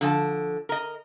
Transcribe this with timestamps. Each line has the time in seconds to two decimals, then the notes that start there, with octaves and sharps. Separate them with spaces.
0.01 D3 F3 G5 A5
0.69 A#4 D#5